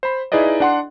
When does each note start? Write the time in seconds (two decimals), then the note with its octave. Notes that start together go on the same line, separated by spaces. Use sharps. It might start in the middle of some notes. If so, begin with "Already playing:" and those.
0.03 C5 B5
0.32 D#4 E4 G#4 B4 D5 D#5
0.60 D4 F#5 C6